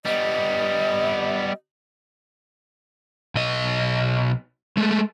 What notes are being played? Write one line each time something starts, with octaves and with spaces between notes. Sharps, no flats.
G3 B3 D#5
B1 D#5
G#3 A3